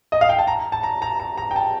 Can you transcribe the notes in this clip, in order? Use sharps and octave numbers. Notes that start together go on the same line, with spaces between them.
D#5
F5
G5
A5
A#5
A5
A#5
A#5
A#5
A#5
G5
A5